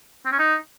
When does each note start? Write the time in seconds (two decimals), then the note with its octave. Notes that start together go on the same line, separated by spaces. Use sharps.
0.25 C4
0.32 C#4
0.39 D#4